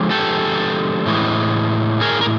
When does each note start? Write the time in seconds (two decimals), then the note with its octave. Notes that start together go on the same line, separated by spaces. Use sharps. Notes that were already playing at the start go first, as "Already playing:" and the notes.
Already playing: D3 F3 G#3
0.11 G4 A4
1.06 A2 E3 G#3
2.01 G#4 A#4
2.21 A#4